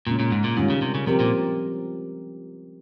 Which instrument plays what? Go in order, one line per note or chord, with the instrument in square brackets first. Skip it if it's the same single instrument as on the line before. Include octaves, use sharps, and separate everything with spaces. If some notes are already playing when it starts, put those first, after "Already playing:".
[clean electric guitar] A#2 [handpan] C#3 G#3 C#4
[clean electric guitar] A#2
G#2
A#2
[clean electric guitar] G#2 [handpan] D#3 G3 C#4 F4
[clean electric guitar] C#3
C3
C#3
[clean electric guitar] C3 [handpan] F3 C4 G4 A#4
[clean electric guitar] A#2